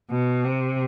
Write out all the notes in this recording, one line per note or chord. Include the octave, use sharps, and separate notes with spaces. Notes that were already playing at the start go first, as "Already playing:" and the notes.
B2
C3